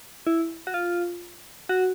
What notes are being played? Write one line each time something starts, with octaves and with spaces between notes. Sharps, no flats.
E4
F#4
F4
F#4